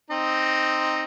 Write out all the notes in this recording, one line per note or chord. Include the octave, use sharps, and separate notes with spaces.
C4 D#4